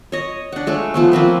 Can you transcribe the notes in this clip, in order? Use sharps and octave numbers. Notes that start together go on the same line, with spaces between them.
C#5 D#5
D4 F#5
G#3 A3 C#5 F5
F3 A3 B3
F3 A#3 C4 B4